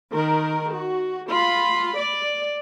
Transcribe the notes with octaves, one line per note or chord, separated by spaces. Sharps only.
D#3 A#4
F#4
F4 B5
D5